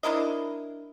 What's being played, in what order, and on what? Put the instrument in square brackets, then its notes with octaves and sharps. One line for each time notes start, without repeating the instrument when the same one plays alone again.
[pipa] D4 E4 A#4 D#5